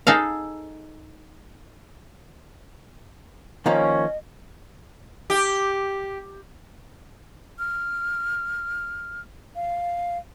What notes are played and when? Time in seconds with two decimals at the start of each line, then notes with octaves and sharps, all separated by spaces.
0.07 D#4 G#4 A4 F5
3.66 D#3 F3 A#3 C#4 D#5
5.30 G4
7.59 F6
9.56 F5